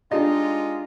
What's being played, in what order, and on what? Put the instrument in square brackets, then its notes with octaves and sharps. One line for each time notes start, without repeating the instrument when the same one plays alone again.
[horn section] G#3 D#4 F4 [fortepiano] D4 G4 D#5